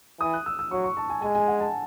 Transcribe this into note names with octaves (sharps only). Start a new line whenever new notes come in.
E3 D#6
F#6
E6
E6
F#3 C#6
C#6
A5
G#5
G#3 G#5
G#5
F#5
A5